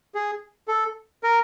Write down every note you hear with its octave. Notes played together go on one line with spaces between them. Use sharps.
G#4
A4
A#4